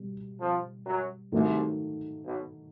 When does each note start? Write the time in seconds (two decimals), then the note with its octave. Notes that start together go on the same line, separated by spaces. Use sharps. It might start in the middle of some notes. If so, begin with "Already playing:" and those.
Already playing: B2 G3
0.39 F2 F3
0.86 F#2 F#3
1.32 C2 C3 D#3 F#3 A3
2.26 B1 B2